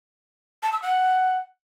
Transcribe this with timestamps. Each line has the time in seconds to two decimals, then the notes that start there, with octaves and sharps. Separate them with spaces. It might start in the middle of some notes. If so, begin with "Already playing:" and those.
0.63 A5
0.72 E6
0.82 F#5